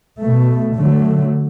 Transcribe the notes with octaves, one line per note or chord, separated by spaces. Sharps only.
B2 A3
D3 F#3 A3